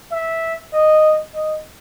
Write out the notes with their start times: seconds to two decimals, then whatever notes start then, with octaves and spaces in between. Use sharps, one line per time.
0.12 E5
0.74 D#5
1.34 D#5